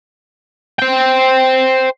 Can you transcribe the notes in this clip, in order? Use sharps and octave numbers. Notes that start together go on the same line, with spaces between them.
C5 G5